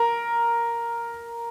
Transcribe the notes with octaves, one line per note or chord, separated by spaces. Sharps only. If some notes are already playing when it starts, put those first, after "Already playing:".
Already playing: A#4